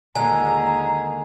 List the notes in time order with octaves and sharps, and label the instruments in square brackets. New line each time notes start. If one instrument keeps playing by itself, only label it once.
[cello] D#2 G#4 [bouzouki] A#2 D3 G#3 [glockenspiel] G#5 [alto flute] A#5